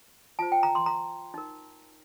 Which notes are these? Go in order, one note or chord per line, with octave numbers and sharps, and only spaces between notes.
F4 C5 A5
G5
A#5
C6
A#5
D#4 A#4